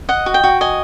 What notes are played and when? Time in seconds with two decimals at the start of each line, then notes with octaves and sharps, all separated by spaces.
0.09 D#5 F#5
0.26 F#4
0.34 G5
0.43 F#4
0.61 D#5 G#5